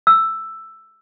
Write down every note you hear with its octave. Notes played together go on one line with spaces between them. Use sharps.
E6